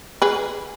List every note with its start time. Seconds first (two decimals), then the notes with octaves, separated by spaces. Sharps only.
0.22 G#4 B4